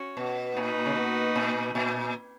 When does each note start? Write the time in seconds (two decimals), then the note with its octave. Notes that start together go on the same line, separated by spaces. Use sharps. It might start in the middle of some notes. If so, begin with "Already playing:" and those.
Already playing: C#4 F#4 C#5
0.17 B2
0.56 A#2 A#3 D#4 F#4 B4
0.86 C#3
0.96 B2
1.36 A#2
1.75 A#2